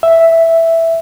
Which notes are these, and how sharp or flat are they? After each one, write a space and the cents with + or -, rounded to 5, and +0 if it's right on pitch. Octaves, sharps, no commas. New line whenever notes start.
E5 +0